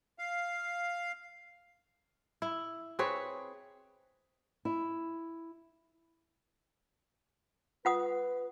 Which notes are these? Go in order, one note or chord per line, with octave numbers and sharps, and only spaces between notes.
F5
E4
C4 G#4 B4 C#5
E4
F4 B4 F#5 D#6